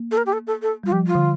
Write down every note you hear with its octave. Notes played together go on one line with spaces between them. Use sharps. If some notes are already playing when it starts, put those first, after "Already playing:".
Already playing: A#3
A4
A#4
G4
A4
A4
A4
G3 F4
F3 G4
F4
D3